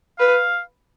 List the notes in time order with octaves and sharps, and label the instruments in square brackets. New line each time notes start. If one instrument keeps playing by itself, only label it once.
[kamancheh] B4 [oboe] F5